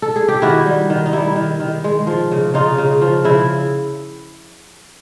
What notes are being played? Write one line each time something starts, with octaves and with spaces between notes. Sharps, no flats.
A4
G#4
G4
D#3 E4 F#4
G3
D#3
D#4
G3 E4
D#3
D#3
G#3
F3
C#3
C#3 D#4 F4
C#3
F3
C#3 E4